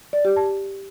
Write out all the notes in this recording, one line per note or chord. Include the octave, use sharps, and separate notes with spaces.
D5
G4
A5